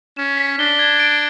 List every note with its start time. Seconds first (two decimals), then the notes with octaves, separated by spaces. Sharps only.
0.17 C#4 E7
0.37 B6
0.59 D4 G7
0.79 G#6
1.00 D7